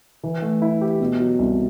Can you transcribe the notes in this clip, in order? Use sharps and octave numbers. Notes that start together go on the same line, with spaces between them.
E3
A3
E4
G4
B2
F#3
C2